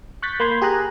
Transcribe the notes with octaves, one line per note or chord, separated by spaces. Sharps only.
C#6 F#6 G6 A6 B6
A#3 B5 C6 G6 G#6
G4 G#4 G#5 A#5 F#6